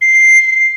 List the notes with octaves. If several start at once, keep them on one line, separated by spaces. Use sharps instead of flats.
C7